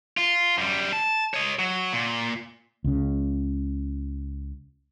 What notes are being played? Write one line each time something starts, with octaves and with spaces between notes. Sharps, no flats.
F4
F#2 G3
A5
C#5 D#5
F#3
A#2
C#2 C#3